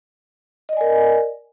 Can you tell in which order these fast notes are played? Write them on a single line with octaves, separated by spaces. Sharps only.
D#5 D5 G#5 A#4